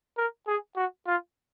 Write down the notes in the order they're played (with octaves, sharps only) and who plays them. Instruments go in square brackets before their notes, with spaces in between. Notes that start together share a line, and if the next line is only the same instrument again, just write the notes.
[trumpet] A#4
G#4
F#4
F4